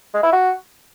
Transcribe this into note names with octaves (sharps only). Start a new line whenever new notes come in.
G#3
E4
F#4